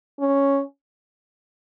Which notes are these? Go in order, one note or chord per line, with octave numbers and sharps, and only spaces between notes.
C#4